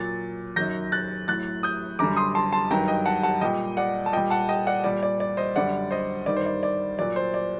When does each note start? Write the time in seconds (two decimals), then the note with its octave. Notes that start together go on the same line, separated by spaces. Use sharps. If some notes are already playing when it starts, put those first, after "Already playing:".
Already playing: A#2 F#3 A6
0.56 F#2 D#3 F#3 G6 A#6
0.92 F#6 A6
1.28 A2 F#3 F#6 A6
1.63 D#6 G6
1.99 F#2 D3 G3 A#5 D6
2.17 C6 D#6
2.35 A5 C6
2.52 A5 C6
2.70 G2 D#3 F#3 G5 A#5
2.88 D#5 G5
3.06 F#5 A5
3.23 F#5 A5
3.41 A#2 G3 D#5 G5
3.77 D5 F#5
4.06 A5
4.13 A#2 G3 D#5 G5
4.30 F#5 A5
4.49 D#5 G5
4.67 D5 F#5
4.84 A#2 G3 D5
5.03 D5
5.20 D5
5.37 C5 D#5
5.56 F#2 D3 G3 D5 F#5
5.91 C5 D#5
6.26 G2 D#3 G3 D5
6.37 C5
6.46 D5
6.63 D5
6.99 A#2 F#3 D5
7.16 C5
7.34 D5